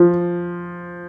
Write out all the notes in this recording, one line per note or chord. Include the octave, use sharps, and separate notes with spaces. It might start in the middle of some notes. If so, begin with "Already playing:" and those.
Already playing: F3